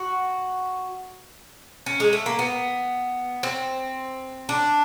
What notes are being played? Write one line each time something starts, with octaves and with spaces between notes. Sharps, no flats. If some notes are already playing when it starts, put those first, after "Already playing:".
Already playing: F#4
C#4
G#3
A3
A#3
B3
C4
D4